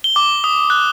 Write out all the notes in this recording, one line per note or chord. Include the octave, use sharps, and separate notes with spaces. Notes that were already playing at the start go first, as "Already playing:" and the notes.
G7
D6
D#6
F#6